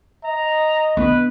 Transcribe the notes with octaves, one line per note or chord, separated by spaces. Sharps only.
D#5 A#5
B3 D4 B4